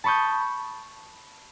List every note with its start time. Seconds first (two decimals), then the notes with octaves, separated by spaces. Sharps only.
0.04 A5 B5 C#6 D#6 G6